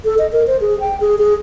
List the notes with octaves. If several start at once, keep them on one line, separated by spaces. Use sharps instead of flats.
A4
D#5
A#4
C5
G#4
G5
G#4
G#4